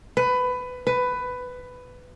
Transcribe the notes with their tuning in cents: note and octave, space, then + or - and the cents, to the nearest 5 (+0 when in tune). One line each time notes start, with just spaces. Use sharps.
B4 +20
B4 +15